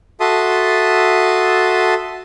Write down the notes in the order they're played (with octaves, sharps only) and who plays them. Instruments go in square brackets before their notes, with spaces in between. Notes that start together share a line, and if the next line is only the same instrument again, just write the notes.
[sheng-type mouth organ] F#4 A4 E5 A5 C6 D#6